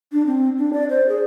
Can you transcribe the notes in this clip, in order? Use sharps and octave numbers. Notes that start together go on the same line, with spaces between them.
D4
C4
D4
D5
C5
G#4